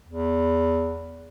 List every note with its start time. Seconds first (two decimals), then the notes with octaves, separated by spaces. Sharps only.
0.08 E2